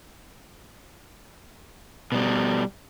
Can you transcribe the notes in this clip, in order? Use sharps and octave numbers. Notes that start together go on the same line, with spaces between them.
B2 G3